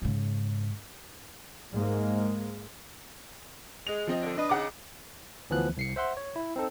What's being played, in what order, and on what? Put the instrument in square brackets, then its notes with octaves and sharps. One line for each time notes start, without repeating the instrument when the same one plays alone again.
[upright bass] G#2 C#3
[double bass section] G#2 G#3 A#3
[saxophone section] G#3 [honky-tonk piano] F7
[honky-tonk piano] F3 C4 D#5
[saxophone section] D3
[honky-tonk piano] D4 [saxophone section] B4 D#5
[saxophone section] C#3 D#4 [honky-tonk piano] F#5 D6
[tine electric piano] D2 E3 F3 B3 F#6
C2 C7 C#7
C5 E5 F#5 C6
C#5
E4
C4 D#4 A4